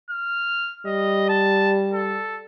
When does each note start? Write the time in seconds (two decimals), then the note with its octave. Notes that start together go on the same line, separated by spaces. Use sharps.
0.11 F6
0.86 G3 D#5
1.29 A5
1.92 A4